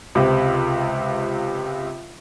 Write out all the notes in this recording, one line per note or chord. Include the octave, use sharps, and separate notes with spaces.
C#2 C3